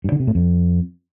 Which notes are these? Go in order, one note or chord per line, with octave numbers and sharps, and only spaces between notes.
G2
D3
C3
A2
F2